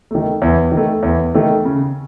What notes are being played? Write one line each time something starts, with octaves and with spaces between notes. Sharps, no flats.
D#3 A3
E2
D#3
A3
E2
D#3 A3
C#3